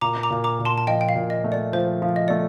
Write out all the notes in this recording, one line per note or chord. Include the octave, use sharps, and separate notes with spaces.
A#2 A#5 D6
A#5 D6
A#2
A#5 D6
A#2
A5 C6
A5
F3 D#5 G5
G5
F5
A#2
D#5
A3
D5
F3 C5
F3
D#5
A3 D5